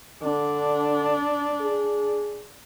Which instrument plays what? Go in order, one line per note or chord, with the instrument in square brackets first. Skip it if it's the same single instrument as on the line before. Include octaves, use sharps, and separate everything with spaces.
[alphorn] D3 [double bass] D4
[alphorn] G#4